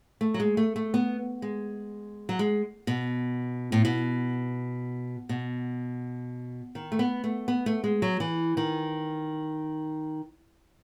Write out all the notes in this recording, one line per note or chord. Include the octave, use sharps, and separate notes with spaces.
A3
F#3
G#3
A3
A3
B3
G#3
F#3
G#3
B2
A2
B2
B2
D#3
A3
B3
A3
B3
A3
G#3
F#3
E3
D#3